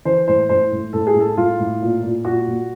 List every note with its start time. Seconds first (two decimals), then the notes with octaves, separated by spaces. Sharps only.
0.05 E3 C5
0.28 A2 C5
0.49 A2 C5
0.72 A2
0.93 A2 A4
1.07 G#4
1.15 A2 A4
1.37 A2 F4
1.59 A2
1.82 A#2
2.03 A#2
2.25 A#2 F#4
2.47 A#2